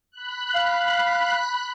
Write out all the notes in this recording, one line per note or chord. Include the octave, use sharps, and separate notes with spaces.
B5 F#6
F5